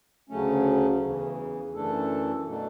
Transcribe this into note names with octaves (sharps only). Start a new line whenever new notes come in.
D2 C#3 F#3 A3 C#4
E2 C#3 E3
F#2 E3 A3 D4 A4
B2 F#3 A3 D4